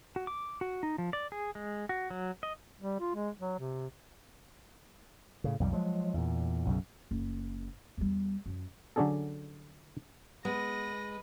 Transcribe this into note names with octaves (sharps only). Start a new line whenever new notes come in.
F#4
D6
F#4
D#4
F3
D5
G#4
G#3
F#4
F#3
D#5
G3
F4
G#3
F#3
C3
A2 C#3
B1 F2 D#3 G3
F3 F#3 G#3
E2 A#2
B1 F#2 C#3
F#1
E2 G3
F#2
D3 F#3 C#4 D4 G#4 A4
G#3 B3 B4 D#5 A#6